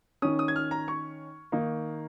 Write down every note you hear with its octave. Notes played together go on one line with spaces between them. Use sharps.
D#3 C#4 D#6
D#6
G#6
F6
A#5
C#6
D#3 A#3 D#4